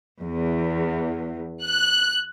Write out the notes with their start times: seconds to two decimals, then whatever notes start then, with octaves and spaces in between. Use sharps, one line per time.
0.22 E2
1.64 F#6